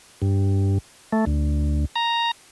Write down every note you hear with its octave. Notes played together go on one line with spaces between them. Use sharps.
G2
A3
D2
A#5